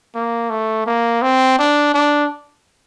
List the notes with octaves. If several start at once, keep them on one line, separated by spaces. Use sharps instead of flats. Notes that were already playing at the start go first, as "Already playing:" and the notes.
A#3
A3
A#3
C4
D4
D4